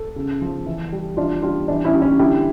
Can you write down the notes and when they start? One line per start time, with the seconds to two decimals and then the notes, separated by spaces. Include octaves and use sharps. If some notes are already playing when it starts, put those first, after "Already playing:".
Already playing: A4
0.16 C#3
0.42 F3
0.66 E3
0.92 G3
1.17 E3 D4 F4
1.42 G3 D4 F4
1.68 E3 D4
1.85 C#4 E4
1.94 G3
2.02 C#4 E4
2.19 D3 E4 G4